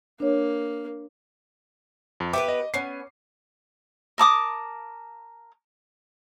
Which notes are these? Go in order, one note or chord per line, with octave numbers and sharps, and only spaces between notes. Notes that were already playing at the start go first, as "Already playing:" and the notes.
A#3 D4 C#5
F2
B3 G4 B4 E5 G5 D6
D#5
B3 C#4 C7
A#4 A5 D6 D#6